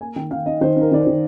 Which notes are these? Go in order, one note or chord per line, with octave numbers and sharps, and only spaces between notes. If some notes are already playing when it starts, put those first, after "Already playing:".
A#3 G#5
D#3 G5
D#3 F5
D#4 D#5
D#3 C5
D#4 A#4
D#3 D5
C5
D#3